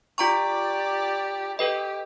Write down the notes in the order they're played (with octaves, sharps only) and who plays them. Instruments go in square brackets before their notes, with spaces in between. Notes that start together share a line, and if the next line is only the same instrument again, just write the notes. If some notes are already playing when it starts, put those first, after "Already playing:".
[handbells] F4 A#5 C#6 [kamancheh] G4 D5
[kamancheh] G4 [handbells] A4 B4 D#5